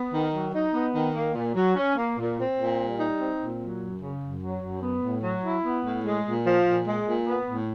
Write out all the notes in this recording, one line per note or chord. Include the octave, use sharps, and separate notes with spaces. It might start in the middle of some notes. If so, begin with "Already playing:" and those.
Already playing: B3
D#3
F#3
D#4
B3
D#3
A#3
A#2
F#3
C#4
A#3
A#2
C4
A#2
G3
D#4
C4
A#2
F#3
F#2
C#3
F#2
F#3
F#2
B3
A2
F#3
E4
B3
A2
G#3
A#2
F3
A#2
G#3
A#2
B3
A2